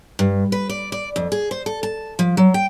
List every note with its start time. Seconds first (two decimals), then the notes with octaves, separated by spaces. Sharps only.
0.19 G2
0.52 B4
0.69 D5
0.92 D5
1.16 F2
1.32 G#4
1.51 C5
1.66 A4
1.83 A5
2.19 F3
2.37 F#3
2.54 G5